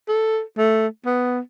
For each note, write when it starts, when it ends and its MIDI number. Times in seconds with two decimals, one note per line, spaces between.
0.08 0.41 69
0.58 0.87 57
1.06 1.40 59